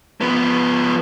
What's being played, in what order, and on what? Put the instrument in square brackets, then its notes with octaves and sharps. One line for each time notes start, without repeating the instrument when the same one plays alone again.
[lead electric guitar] F3 B3